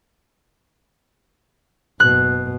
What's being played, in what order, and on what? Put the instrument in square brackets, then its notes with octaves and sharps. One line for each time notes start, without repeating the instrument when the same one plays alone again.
[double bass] F#1 B2 [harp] F#6